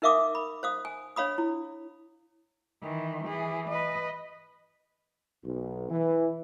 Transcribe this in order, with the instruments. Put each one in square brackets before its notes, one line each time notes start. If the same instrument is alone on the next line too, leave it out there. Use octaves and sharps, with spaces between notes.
[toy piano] D#4 A#4 E5 F5 D6 D#6
B5
C5 F5 D#6
G#5
D4 C#5 F5 B5 D#6
E4
[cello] D#3 E3
E3 G#4
B4 D#5
[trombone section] B1
E3